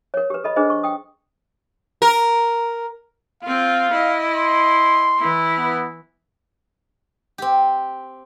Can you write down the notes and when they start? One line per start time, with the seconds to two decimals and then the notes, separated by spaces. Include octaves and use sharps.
0.14 A#4 C#5
0.30 G4 B4
0.44 A4 D#5 B5
0.56 D4 G#4 B4 C5 D#5
0.70 C#6
0.84 G5 D#6
2.02 A#4
3.43 C4 F4 F5
3.92 E4 D#5
4.36 C6
5.19 E3 E4
5.58 B3
7.38 C4 G4